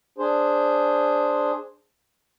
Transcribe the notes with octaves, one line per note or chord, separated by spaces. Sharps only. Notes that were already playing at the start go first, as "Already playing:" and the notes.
D4 G#4 C5